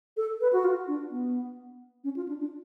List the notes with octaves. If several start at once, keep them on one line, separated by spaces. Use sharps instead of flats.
A4
B4
F#4
F4
D4
B3
C#4
F4
D4
D4